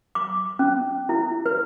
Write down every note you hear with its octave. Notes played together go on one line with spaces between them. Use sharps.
D6
C#4
E4
B4